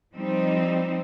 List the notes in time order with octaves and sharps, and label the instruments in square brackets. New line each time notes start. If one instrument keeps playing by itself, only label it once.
[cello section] F3 G3 C4 D#4